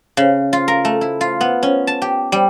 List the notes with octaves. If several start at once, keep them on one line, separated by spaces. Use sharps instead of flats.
C#3
F4
A#4
A3
E4
F4
B3
C#4
A5
G4
G3